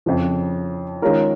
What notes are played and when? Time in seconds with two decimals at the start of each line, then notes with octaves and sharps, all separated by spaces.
0.06 F2 C#3 F3
1.02 D#3 G#3 C#4 F4 A#4